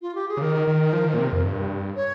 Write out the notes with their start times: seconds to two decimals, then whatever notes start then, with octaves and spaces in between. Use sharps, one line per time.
0.02 F4
0.15 G4
0.29 G#4
0.37 C#3
0.42 D#3 A#4
0.68 D#3
0.93 F3
1.06 D#3
1.14 A#2
1.19 C3
1.32 F2
1.45 G2
1.96 C#5